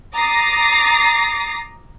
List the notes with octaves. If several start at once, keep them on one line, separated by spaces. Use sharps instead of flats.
A#5 D6 D#6 A6 A#6 C7